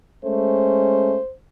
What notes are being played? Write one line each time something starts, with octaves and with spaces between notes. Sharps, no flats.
G#3 A3 C#4 C5